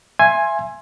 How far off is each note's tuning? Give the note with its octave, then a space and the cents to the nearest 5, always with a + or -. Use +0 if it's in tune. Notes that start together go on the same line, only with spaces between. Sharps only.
E5 +30 G#5 +0 C6 +20